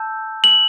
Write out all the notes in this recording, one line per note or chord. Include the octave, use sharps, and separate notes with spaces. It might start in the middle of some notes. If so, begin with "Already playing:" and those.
Already playing: A5 E6 G6
F#7